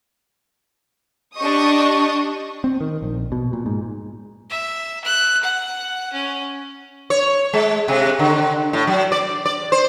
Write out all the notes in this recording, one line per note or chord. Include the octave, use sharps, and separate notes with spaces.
D4 G4 D#5 C#6 D#6
C4
D#3
A#1
B2
A#2
G#2
E5
F#6
F#5
C#4
C#5
G#3
C3
D3
A2
F#3
D5
D5
C5